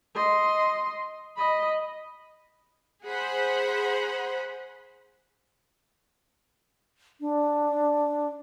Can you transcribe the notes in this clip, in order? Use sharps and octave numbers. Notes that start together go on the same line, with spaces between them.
D#5 C6
D#5 B5
G#4 C5 F#5 B5
D4